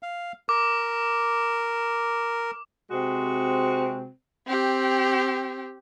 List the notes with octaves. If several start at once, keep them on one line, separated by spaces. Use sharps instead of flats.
F5
A#4 D6
C3 G#3 C4 F#4
C4 G4